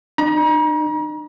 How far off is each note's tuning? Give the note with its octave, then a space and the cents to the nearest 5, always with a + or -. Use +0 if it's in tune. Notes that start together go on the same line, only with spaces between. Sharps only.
D#4 -45 A#5 +40